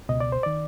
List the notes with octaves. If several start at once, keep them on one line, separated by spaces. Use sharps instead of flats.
C#2 B2 D#5
D5
C5
D#3 D5